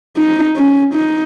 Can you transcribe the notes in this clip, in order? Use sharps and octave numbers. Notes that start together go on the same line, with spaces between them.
D#4
C#4
D#4